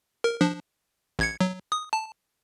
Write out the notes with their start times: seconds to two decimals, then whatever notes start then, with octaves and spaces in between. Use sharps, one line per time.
0.24 A#4
0.41 F3 D4
1.19 A1 G#6 C#7
1.41 F#3
1.72 D#6
1.93 A5